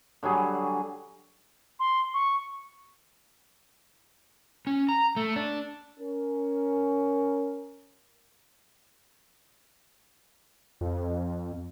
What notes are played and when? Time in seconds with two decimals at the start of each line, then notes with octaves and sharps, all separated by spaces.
0.23 D3 F#3 G3 G#4
1.80 C6
2.14 C#6
4.67 C#4
4.89 A#5
5.16 A3
5.36 D4
5.99 C#4 A#4
10.81 F2